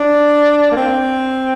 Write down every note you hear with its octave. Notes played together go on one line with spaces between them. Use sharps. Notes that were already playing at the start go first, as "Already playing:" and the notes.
Already playing: D4
A#3
C4